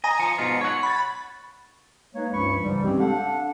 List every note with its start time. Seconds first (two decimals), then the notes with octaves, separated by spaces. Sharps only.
0.04 D#5 G#5 A#5
0.20 F3 C#7
0.38 G#2 B2 F4
0.61 C#5 F#5
0.83 B5 A6
2.15 G#3 A#3 D#4 B4 C#5
2.33 C#2 G2 F3 C#4 B5 C#6
2.62 G#2 C#3 E3 F3 G3
2.84 G3 G#3 C4 C#4 G4
3.00 D4 A4 F5 F#5